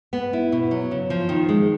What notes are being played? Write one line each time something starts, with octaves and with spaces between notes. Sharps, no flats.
B3
E4
B2
F#3
C#3
F3
D#3
G#3